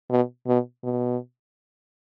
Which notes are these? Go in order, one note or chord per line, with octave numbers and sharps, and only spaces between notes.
B2
B2
B2